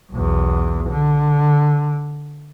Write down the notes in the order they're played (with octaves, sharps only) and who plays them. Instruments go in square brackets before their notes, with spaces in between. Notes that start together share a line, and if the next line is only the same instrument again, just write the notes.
[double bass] B1 E2
D3